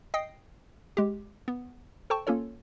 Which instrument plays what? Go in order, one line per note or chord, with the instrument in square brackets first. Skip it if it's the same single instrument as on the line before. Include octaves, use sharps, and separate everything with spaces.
[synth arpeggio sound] D#5 G5 D#6 C7
G#3 G4
B3
A4 C5 G5 A5 C#6
A#3 C#4 F4 A4 C#5